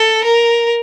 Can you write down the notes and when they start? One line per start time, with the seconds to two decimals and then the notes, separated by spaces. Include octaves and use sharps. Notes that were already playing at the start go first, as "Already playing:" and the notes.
Already playing: A4
0.24 A#4